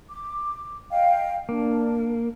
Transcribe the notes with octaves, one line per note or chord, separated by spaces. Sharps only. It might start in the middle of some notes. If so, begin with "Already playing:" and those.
D6
D#5 F5 G5
A#3 D4